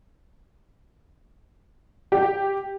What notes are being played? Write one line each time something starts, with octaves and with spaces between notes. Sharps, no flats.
G4